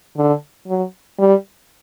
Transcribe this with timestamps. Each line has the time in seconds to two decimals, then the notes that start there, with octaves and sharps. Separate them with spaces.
0.17 D3
0.68 F#3
1.19 G3